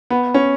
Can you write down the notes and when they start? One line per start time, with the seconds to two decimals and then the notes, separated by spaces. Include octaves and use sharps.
0.10 B3
0.34 C#4